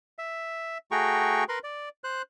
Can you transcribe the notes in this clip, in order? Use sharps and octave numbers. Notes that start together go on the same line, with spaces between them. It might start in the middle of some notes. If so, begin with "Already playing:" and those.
E5
A3 F#4 G#4 G5 A#5 C#6
A#4 B4 B5 C6
D5
C5 F#6